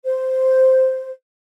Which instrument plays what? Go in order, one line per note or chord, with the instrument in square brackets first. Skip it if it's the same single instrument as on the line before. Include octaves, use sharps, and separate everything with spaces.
[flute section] C5